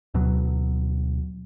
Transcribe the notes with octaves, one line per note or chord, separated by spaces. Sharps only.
D2 B2 F#3